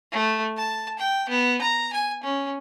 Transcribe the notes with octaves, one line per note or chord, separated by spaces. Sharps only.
A3
A5
G5
B3
A#5
G#5
C#4